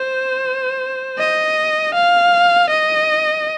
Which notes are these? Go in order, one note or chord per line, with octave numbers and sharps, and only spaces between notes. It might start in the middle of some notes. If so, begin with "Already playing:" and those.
Already playing: C5
D#5
F5
D#5